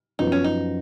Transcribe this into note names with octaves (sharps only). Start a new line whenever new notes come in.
F#2 F3 B3 D#4
C#4
D#4